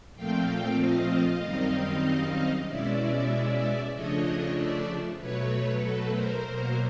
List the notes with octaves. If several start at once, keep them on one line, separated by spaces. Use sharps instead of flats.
A#2 F3 A3 C4 F5 G5
D#5 F5
F#2 D#3 G3 C4 D#4
B2 G#3 C#4 E4 D5 E5
C#3 F3 A3 D4 C#5 D#5
D5 E5
B2 F#3 A3 B4 C#5
A4 B4
A#4 C5
B2 F#3 A#3 A#4 C5